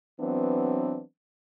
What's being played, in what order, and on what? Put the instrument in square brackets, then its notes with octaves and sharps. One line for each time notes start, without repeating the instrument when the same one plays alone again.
[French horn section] E3 F#3 B3 C4 D4